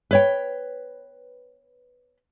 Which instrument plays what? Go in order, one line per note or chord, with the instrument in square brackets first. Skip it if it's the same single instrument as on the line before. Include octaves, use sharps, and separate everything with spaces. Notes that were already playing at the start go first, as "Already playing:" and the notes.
[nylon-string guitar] B4 C#5 G5